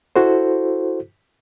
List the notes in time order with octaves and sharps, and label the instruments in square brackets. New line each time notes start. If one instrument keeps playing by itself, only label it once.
[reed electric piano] E4 F#4 A4 C5